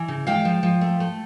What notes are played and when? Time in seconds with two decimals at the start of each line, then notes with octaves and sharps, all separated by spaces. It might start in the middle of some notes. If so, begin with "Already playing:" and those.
Already playing: E3
0.08 C#3
0.27 G#3 F5 G5
0.45 F3
0.63 F3
0.81 A3
1.00 A3